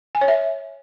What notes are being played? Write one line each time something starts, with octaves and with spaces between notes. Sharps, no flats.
G#5
C#5
E5